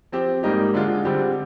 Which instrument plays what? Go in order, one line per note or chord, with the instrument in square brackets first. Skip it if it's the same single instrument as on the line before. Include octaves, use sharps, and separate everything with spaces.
[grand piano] F3 C4 G4
G#2 G3 A#3 D#4 G4
D3 G#3 D4 F4 G#4
D3 G3 C4 G4